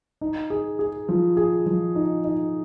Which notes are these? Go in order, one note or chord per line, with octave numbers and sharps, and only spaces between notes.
D#4
G#4
G#4
F3
G#4
F3
D#4
D#4